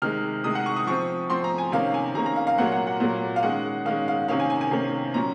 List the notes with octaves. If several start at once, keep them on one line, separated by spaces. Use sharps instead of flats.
C3 D#3 G#3 F6
C3 D#3 G#3 D#6
F#5
C#6
D#6
F3 C4 C#6
F3 C4 C6
A#5
G#5
C3 D#3 A#3 C#4 F5
G#5
C3 D#3 A#3 C#4 A#5
A#5
F5
F5
A#2 F#3 A#3 F#5
F#5
F#5
A#2 F#3 A#3
F5
D#3 G#3 C#4 F#5
D#3 G#3 C#4 F5
F5
C3 D#3 A#3 C#4 F5
G#5
G#5
G#5
C3 D#3 A#3 C#4
A#2 F#3 C#4 A#5